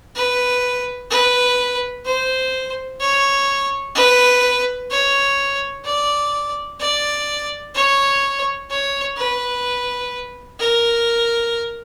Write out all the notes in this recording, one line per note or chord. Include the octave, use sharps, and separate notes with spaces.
B4
B4
C5
C#5
B4
C#5
D5
D5
C#5
C#5
B4
A#4